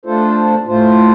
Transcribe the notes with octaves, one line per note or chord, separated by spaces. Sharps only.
A3 D4 F4 A4 C5
A2 A3 F4 C5